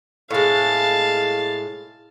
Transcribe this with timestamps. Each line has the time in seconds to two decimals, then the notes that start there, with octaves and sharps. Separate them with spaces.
0.31 A2 G#3 F5 A5